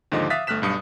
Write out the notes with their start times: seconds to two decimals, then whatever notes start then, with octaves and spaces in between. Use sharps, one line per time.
0.12 D#2 G#2 D3 F3 D#5 D6
0.30 E5 F5 D#6 F#6 A6 B6
0.47 G1 A3 F6 F#6 B6 E7
0.62 B1 G2 D#6 C#7